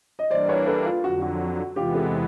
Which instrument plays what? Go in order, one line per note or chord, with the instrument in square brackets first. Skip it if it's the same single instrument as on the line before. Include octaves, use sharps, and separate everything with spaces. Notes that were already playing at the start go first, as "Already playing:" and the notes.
[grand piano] D#5
[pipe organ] E3 G3 A#3 D4 [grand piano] C5 D5
[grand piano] B4 C#5
A4 B4
F4
[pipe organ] F2 D3 F#3 [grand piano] F#4
[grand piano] F#4
[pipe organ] E2 C3 E3 G#3 B3 [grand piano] F4 G4
[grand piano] G4 A4